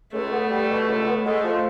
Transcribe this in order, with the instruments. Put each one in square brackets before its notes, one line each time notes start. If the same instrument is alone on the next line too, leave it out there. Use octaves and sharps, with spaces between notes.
[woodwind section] C#2 [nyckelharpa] A3
[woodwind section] B3
G3
B2
C#2
B3
[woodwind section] G#3 [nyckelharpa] A3
[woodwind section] F3